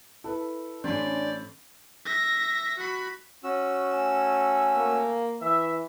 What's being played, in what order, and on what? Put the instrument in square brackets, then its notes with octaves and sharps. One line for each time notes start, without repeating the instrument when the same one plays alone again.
[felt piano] E4 B4 [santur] A4
[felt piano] A1 [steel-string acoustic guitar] C#4 D4 [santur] C5 B5 C6 [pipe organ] D5
[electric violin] E5 A#6
F#4 B5
[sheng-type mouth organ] C#4 F#4 E6
[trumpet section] A3 G#5
[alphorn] A#3
[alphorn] E3 [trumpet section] E5